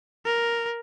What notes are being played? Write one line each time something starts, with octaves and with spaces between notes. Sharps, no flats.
A#4